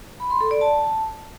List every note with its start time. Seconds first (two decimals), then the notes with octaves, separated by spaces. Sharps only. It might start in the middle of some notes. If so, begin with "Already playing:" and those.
0.20 B5
0.30 C6
0.41 A4
0.51 D5
0.61 A5